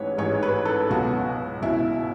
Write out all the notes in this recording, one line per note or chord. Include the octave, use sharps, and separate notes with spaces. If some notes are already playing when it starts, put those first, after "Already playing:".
Already playing: A1 G#2 G#3 B4 C#5
A1 G#2 G#3 C#5
B4
A4
C#2 B2 F#3 F#4
C#2 B2 F#3 E4